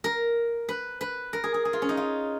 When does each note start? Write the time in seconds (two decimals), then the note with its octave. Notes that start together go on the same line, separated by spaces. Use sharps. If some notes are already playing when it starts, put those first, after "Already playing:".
0.04 A#4
0.69 B4
1.01 B4
1.33 A#4
1.44 G#4
1.54 G#4
1.65 G#4
1.73 F4
1.82 C#4
1.89 D#4
1.97 F4